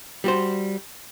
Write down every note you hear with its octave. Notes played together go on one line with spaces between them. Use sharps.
G3 F#4 C5